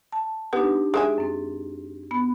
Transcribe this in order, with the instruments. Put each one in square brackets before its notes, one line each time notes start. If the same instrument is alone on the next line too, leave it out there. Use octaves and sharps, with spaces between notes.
[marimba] A5
[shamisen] B3 [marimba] D4 D#4 G4
[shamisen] G#3 E5 G#5
[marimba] F#2 C4
B3 B5